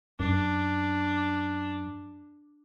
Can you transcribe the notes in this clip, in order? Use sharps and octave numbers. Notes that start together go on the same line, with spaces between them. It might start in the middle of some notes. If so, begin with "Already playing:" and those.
F#2 D4